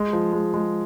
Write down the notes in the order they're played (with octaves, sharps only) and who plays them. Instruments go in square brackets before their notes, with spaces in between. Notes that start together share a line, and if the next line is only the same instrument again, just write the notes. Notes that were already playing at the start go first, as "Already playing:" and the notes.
Already playing: [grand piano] G#3
F3
G#3
G#3